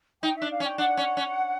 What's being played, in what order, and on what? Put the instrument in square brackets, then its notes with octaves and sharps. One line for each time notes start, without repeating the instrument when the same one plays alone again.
[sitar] D#4 [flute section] G5
[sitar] D4 [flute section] E5
[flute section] F5
[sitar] C#4
[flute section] G5
[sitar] D4 [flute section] F#5
[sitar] C#4
C#4